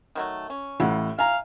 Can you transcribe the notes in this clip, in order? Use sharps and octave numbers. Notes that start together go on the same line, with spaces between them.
D#3 F#3 A3
C#4
A1 A2 E4 F4 F#5
E5 F5 G#5 A#5